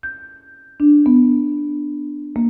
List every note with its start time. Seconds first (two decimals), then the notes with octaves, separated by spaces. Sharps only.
0.03 G6
0.80 D4
1.06 B3
2.36 A#3